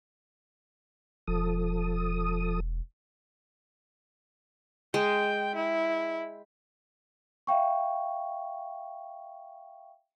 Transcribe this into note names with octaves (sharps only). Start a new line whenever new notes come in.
E1 F3 A4 D#6
G#3 G5
E4
E5 F5 G5 C#6